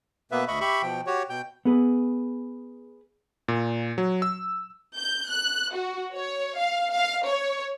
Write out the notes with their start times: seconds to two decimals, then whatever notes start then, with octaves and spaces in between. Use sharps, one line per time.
0.31 B2 A#3 B3 B4 E5
0.48 D2 D#5 E5 B5 C#6
0.60 G4 E5 B5 C#6
0.82 B2 F3 G5
1.07 F#4 G4 C#5
1.30 B2 G5 G6
1.65 B3 G#4 B4
3.48 A#2
3.98 F#3
4.22 E6
4.97 G6
5.28 F#6
5.74 F#4
6.14 C#5
6.57 F5
6.94 F5
7.28 C#5